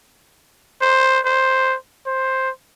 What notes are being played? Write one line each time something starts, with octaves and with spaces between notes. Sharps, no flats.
C5
C5
C5